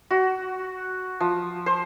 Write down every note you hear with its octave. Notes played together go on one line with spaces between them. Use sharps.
F#4
F3
C5